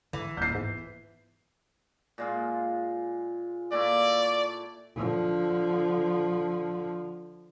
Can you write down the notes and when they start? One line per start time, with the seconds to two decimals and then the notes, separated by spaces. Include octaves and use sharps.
0.13 G#2 D3 E3
0.37 D#1 D#3 G6 C7
0.55 G#2 B3
2.18 A#2 G#3 F4
3.72 A#2 A3 E4 D5
4.96 D3 F3